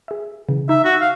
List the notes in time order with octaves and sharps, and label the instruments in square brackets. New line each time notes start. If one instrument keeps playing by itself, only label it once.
[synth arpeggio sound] G#4 E5
C#3 E3
[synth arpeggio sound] D#4 [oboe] E5
[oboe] F#4
F5